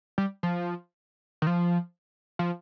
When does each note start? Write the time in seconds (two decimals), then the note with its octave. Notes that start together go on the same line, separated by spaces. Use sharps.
0.18 G3
0.43 F3
1.42 D#3
1.47 F3
2.39 F3